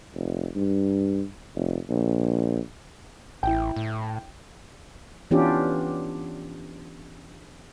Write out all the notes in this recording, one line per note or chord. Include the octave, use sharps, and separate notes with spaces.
F1
G2
F1
A#1
A1 E4 G5
A2
E3 B3 C#4 D4 F4 G4